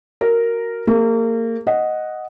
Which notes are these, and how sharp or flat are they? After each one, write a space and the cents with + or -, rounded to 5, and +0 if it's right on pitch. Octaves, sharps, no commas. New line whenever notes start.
F#4 +0 A#4 -5
A#3 -30 G#4 -35
D#5 +0 F#5 +0